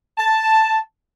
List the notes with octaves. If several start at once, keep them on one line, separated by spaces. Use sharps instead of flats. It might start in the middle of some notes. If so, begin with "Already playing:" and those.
A5